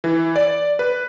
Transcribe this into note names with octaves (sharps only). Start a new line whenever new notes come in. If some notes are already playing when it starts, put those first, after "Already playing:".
E3
D5
B4